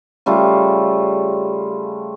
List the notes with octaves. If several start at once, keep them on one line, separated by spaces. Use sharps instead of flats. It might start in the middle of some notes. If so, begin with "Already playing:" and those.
C#3 G3 A3 F4